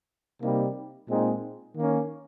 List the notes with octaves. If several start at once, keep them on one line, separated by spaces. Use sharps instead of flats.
C3 G3 A#3 D#4
A#2 G#3 C4 D#4
D#3 A#3 C#4